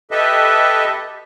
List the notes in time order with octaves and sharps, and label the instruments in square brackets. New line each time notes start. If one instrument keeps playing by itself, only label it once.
[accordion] G4 A4 B4 D#5 E5